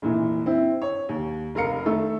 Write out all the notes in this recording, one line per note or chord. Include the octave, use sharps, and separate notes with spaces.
F1 A#2 E3
C4 E4
C#5
D#2
F1 A#4 F5 C#7
D#3 A3 A4